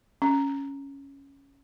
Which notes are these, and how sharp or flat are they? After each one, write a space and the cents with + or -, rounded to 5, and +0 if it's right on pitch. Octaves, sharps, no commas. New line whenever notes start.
C#4 +0